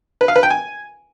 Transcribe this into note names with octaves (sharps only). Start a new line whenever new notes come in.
B4
F5
B4
G5
G#5